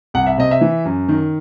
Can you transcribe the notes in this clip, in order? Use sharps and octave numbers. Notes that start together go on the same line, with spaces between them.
C2 F#5
E5
C3 D#5
E5
E3
F#2
D#3